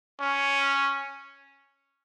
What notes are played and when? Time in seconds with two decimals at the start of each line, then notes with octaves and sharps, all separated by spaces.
0.20 C#4